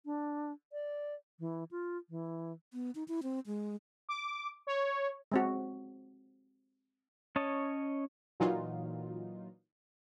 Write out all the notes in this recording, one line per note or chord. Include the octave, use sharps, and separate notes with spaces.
D4
D5
E3
F4
E3
B3
D#4
E4
C4
G#3
D6
C#5
G#3 C4 F#4
C#4 C#5 D#5 A5
A#2 E3 F#3 D#4 F4